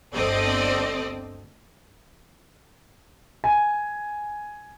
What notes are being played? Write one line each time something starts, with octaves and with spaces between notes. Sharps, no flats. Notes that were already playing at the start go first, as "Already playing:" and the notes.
G1 D2 C4 A4 D5 D#5
G#5